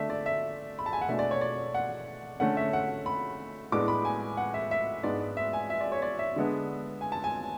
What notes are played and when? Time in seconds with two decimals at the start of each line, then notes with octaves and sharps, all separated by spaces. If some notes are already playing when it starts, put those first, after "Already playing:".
Already playing: D3 A3 D4 E5
0.10 D5
0.26 E5
0.79 B5
0.86 A5
0.93 G#5
1.01 F#5
1.08 B2 A3 D4 E5
1.19 D5
1.31 C#5
1.41 D5
1.74 F#5
2.40 D3 A3 C#4 F#5
2.57 E5
2.73 F#5
3.06 B5
3.72 A2 G#3 B3 D4 D6
3.88 B5
4.05 G#5
4.37 F#5
4.54 E5
4.71 E5
5.03 G#2 G#3 B3 D4 D5
5.20 D5
5.37 E5
5.53 G#5
5.70 E5
5.81 D5
5.92 C#5
6.02 D5
6.19 E5
6.36 D3 G#3 B3 D4
7.01 G#5
7.12 A5
7.24 G#5